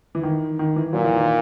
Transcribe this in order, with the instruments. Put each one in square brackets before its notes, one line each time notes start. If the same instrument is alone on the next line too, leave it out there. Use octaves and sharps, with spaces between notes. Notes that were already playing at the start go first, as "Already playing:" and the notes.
[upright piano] E3
D#3
D#3
E3
[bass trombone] A#2 [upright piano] F#3
[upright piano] E3
D#3